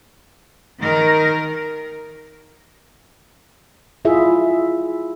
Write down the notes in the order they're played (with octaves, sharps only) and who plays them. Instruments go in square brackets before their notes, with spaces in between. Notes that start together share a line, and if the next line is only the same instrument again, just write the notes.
[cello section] D#3 A#4
[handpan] E4 F4 G#4 E5